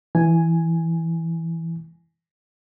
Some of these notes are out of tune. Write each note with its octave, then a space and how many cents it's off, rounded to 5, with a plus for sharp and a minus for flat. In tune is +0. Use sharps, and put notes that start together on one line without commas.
E3 +0 G#5 +0